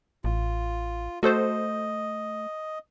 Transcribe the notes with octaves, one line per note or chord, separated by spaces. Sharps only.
A1 F4
A3 F#4 A4 C5 D#5